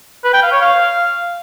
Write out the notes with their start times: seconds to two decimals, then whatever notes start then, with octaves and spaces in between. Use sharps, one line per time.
0.24 B4
0.33 G5
0.42 F5
0.52 C#5
0.61 F5